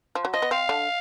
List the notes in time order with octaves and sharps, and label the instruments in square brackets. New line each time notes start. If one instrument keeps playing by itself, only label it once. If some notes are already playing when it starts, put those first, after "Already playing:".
[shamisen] F3
F#3
[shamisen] F3 [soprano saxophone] D#5
[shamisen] B3
[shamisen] C4 [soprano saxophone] F5
[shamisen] D3 D4